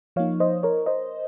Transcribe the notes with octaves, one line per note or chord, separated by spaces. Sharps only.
F3 A#3 D#4 C#5 F5
C5 D#5
A#4 C#5
C5 D#5